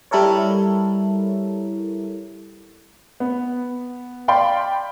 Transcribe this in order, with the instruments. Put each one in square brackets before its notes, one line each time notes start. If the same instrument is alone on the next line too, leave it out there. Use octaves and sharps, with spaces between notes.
[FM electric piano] G3 E4 A4 A#4 C#5
[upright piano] B3
D5 F5 G5 B5 C6